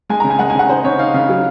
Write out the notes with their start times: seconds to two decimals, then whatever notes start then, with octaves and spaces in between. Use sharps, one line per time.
0.10 G#3 G#5
0.20 A#5
0.24 C#3
0.30 G#5
0.39 G#3 F#5
0.50 G#5
0.55 C#3 F#5
0.69 D#4 C5
0.84 C#3 C#5
0.99 D#4 F5
1.14 C#3 F5
1.29 F#3